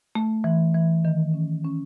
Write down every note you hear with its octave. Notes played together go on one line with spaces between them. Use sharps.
A3
E3
E3
D#3
C#4
C#4